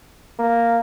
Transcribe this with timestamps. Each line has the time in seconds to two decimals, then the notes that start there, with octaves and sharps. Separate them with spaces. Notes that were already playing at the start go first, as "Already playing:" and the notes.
0.39 A#3